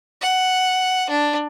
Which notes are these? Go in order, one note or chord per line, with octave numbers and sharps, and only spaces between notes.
F#5
D4